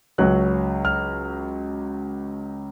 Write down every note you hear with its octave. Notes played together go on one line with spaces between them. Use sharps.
C#2 C#3 F#3 C#4 F#6
F6